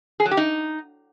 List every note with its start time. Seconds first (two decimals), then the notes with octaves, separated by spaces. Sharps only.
0.20 G#4
0.26 F#3
0.31 G4
0.37 D#4